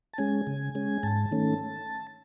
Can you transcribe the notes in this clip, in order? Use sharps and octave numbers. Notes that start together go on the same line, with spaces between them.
A5
G#3 C#4 G#5
C#3
G#3 C#4
G#2 A5
D#3 A3 C#4